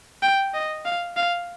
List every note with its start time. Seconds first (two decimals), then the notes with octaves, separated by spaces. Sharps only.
0.22 G5
0.54 D#5
0.85 F5
1.16 F5